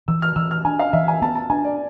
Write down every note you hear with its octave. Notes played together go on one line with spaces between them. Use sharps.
E3 E6
F6
E3 E6
F6
D4 G#5
F5
E3 E5
G#5
B3 A5
A5
D4 G#5
D5